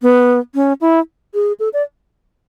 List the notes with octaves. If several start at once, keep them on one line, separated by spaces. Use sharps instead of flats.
B3
C#4
E4
G#4
A4
D5